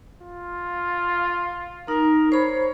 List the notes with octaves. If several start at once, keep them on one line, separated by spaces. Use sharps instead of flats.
F4
D#4 A#4
C5 C#5 B5